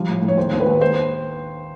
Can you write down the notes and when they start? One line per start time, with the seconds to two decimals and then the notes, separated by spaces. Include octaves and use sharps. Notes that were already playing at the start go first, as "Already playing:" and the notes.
Already playing: F3 G3
0.08 A2
0.22 A2
0.28 C#5
0.37 D#2 C5
0.53 D#2
0.60 B4
0.66 D#2
0.81 C5